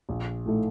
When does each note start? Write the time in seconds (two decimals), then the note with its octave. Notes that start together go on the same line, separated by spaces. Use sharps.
0.09 A#1
0.46 A2 A3 D#4 A4